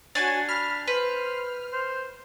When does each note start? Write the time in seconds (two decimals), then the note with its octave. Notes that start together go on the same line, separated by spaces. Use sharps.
0.15 D4 F#4 C#5 G#5 A6
0.49 B5 F6
0.87 B4 C5
1.73 C5